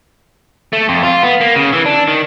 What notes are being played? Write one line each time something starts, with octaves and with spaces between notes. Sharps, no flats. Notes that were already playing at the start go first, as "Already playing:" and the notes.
A3
F2
F4
B3
A#3
C#3
E3
D4
D#3